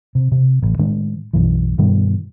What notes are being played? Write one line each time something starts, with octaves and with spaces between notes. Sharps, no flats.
C3
C3
A1
A2 D#3 G#3 D4
B1 F#2 E3
G2 B2 D#3 G3